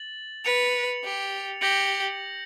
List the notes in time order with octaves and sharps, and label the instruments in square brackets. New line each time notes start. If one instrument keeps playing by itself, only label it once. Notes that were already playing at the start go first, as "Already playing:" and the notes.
Already playing: [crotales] A6 F#7
[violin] B4 [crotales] A6 C#7 F7
[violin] G4
[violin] G4 [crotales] G6 A#6 C#7 F#7